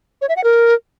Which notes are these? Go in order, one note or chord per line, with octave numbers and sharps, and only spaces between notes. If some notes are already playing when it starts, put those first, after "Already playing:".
C#5
E5
F#5
A#4